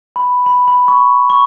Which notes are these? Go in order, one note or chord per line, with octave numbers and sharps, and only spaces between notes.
B5
B5
B5
C#6
C#6